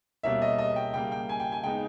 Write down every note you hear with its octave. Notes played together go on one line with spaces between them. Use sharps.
B2 G3 A#3 C#4 E5
D#5
D#5
G5
C#3 G3 A#3 G5
G5
G#5
G5
G#5
C#3 G#3 B3 D#4 G5